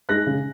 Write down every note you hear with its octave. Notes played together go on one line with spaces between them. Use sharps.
G#3 D#4 F#6 A#6
C#3